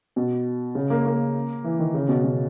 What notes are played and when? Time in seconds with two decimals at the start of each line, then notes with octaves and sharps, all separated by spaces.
0.16 B2
0.75 C#3
0.90 A#3
1.06 A#3
1.64 E3
1.79 D#3
1.94 C#3
2.09 B2
2.24 B2